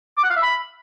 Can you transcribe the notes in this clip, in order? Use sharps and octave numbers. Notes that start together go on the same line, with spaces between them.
D6
F#5
F5
E5
B5